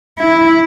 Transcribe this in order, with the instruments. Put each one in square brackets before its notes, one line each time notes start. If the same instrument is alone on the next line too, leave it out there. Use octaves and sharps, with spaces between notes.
[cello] E4